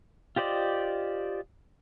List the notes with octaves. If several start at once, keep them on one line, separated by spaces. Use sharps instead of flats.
F4 G4 C5 D5 D#5